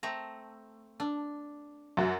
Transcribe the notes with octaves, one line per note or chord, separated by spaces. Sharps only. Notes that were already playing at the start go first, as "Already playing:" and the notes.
A3 C4 A#5
D4
F#2 F#4